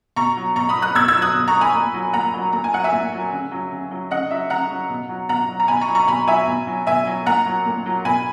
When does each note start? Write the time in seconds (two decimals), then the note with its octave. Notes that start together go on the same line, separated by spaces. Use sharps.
0.16 B2 A#5 C#6
0.37 F#3
0.56 B2 A#5 C#6
0.69 B5 D#6
0.76 F#3
0.82 D#6 F#6
0.95 B2 E6 G#6
1.08 E6 G#6
1.16 F#3
1.22 D#6 F#6
1.34 B2
1.48 A#5 C#6
1.54 F#3
1.61 G#5 B5
1.74 A#2
1.94 F#3
2.13 A#2 F#5 A#5
2.34 F#3
2.53 A#2 A#5
2.64 G#5
2.73 F#3 F#5
2.84 E5 G#5
2.92 A#2
3.12 F#3
3.32 C#3
3.52 F#3
3.72 C#3
3.91 F#3
4.11 C#3 D#5 F#5
4.31 F#3 E5
4.50 C#3 F#5 A#5
4.70 F#3
4.90 B2
5.09 F#3
5.29 B2 F#5 A#5
5.49 F#3
5.60 A#5
5.68 B2 G#5 B5
5.81 A#5 C#6
5.88 F#3
5.95 A#5 C#6
6.08 B2 G#5 B5
6.28 F#3 E5 G#5
6.47 B2
6.67 F#3
6.87 B2 E5 G#5
7.07 F#3
7.26 A#2 F#5 A#5
7.46 F#3
7.66 A#2
7.86 F#3
8.05 B2 G#5 B5